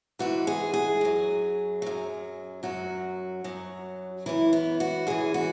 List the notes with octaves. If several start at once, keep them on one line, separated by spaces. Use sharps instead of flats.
G#2 E3 F#4
G#4
G#4
F#2 F#3
F#2 F#3
F#2 F#3 F#4
F#2 F#3
F#2 E3 E4
B3
F#4
F#2 E3 G#4
F#4